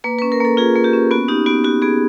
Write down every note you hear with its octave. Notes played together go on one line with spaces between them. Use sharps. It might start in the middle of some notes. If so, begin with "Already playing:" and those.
A#3 B4
C#4 B4
A#4
A#3 A4
F4 G#4
A#3
G4
C#4
B3 F#4
D#4 G4
B3 F#4
F#4 G4
B3 G#4